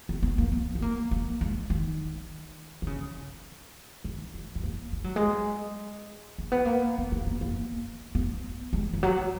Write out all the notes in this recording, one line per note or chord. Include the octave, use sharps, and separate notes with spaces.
B3
B3
A#3
B3
B3
A#3
A#3
G#3
D#3
D#3
C#3
D#3
G#3
G#3
A#3
G#3
F#3
G#3
A#3
B3
A#3
B3
A#3
B3
A#3
B3
G#3
E3
F#3